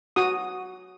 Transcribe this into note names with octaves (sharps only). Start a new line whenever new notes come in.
F#4 D#6